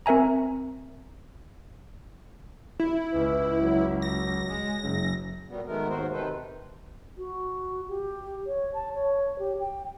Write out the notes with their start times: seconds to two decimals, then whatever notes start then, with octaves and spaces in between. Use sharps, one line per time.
0.06 C4 A#4 E5 G#5 A#5
2.80 E4
3.13 C#2 B4
3.62 F#3
4.02 A#6
4.49 G#3
4.82 F#1 C#3
5.49 A#2 F#3 G3 B3
5.67 D#3 G#3 A3 B3 A#4
5.88 D#2 G#2 D#3 F#4 A#4 C5
6.13 C3 D#3 D#4 A4 B4 C5
7.18 F#4
7.89 G4
8.47 C#5
8.74 A5
8.94 C#5
9.39 G4
9.60 G5